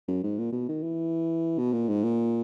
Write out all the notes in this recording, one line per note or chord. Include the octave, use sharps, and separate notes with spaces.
F#2
G#2
A#2
B2
D#3
E3
B2
A#2
G#2
A#2